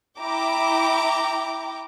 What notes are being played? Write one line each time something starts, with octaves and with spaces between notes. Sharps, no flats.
E4 G5 A#5 D6